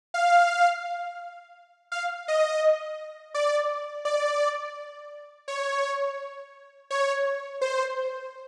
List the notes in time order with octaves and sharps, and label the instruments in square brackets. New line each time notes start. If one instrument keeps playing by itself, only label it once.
[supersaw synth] F5
F5
D#5
D5
D5
C#5
C#5
C5